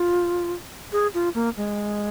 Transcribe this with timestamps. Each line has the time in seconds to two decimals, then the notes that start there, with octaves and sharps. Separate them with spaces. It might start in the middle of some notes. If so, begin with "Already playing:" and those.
Already playing: F4
0.92 G#4
1.14 F4
1.35 A#3
1.57 G#3